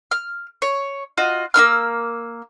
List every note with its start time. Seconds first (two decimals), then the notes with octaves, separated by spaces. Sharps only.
0.11 F6
0.62 C#5
1.17 F4 F#4 D#5
1.54 A#3 D#4 E6 F6